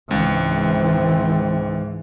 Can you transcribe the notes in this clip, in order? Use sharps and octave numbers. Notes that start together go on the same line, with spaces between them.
C#2 G#2 E3 C4